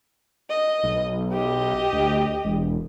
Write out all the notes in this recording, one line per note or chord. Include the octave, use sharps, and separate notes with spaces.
D#5
B1
G4 D#5
D2
E1